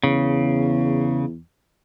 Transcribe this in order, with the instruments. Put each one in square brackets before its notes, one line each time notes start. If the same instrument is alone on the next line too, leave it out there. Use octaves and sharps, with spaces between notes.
[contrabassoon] E2 [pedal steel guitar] C#3